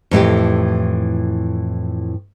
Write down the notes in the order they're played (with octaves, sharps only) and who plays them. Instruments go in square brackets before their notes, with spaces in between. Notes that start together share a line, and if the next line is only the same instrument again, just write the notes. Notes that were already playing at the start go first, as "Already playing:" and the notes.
[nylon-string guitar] F2 A2 E3 G4